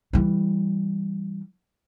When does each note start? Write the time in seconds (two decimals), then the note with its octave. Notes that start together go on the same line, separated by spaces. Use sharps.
0.13 E3 G3